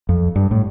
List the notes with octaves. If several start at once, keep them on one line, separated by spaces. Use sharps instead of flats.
F2
G2
A2